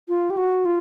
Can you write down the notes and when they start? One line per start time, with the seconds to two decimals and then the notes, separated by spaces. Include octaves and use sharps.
0.08 F4
0.30 G4
0.37 F#4
0.65 F4